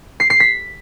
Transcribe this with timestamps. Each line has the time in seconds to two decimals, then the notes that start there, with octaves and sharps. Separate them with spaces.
0.20 C7
0.30 C7
0.40 B6